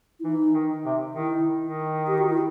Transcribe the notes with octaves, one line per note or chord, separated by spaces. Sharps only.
E4
E3 D#4
D#3
C3
D#3 E4
D#3
G4
F#4
E4